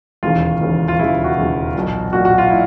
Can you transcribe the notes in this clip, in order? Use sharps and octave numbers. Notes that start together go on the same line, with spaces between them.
E1 D#2 C#3 E3 F4
E1 D#2 C#3 E3
F4
E1 D#2 C#3 E3 E4
F#4
E1 D#2 C#3 E3
B1 A#2
B1 A#2 F#4
F#4
F4
A#2 E4